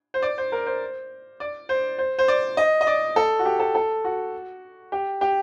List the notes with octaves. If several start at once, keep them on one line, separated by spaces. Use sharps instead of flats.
C5
D5
C5
A#4
C5
D5
C5
C5
C5
D5
D#5
D#5
D5
A4
F#4
G4
A4
A4
F#4
G4
G4